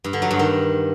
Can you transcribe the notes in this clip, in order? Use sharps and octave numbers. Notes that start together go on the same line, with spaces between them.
G2
D3
F#3
G2
D#3